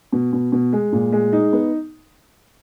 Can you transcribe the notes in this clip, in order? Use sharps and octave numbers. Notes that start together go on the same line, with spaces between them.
B2
B2
B2
G#3
A#2
G#3
D#4
B3